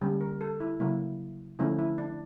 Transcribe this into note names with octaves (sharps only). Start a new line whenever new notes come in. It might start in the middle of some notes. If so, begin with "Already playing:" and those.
D3 G3 A#3 C#4
A#4
A4
E4
C#3 F#3 A#3 E4
D3 F3 A3 C#4 E4
E4
D4